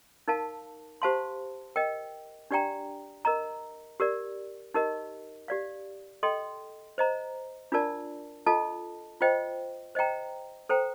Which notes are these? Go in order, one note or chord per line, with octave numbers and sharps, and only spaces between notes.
D#4 A#4 F5 A5
G4 C5 F5 A5 C6
A#4 D#5 G5
D4 G4 D5 G5 A#5
A#4 D#5 A#5
G4 A#4 D5
D#4 G4 A#4 D#5
G4 D5 F5
A4 D#5 G5 C6
C5 D#5 A#5
D4 F4 A#4 D5 A5
F4 A4 D#5 A5
F4 C5 D#5 G5
C5 D#5 G5 A#5
A4 C5 G5 A#5